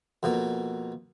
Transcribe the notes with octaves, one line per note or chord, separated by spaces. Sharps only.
F2 B2 A#3